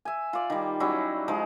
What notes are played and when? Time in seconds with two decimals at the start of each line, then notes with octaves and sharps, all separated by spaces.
0.05 E5 G#5
0.33 F4 D5
0.50 D#3 G3
0.80 F#3 G3 C#4 E4
1.28 F3 G#3 D#4